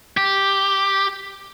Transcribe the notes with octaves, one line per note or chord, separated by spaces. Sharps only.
G4